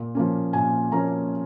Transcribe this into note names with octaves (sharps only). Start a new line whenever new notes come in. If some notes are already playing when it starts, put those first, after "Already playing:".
Already playing: A#2
F3 A#3 C#4
A#2 G#5
F3 A#3 C#4 A#5